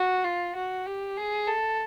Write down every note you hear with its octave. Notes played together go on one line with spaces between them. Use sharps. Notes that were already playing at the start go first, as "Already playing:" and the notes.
Already playing: F#4
F4
F#4
G4
G#4
A4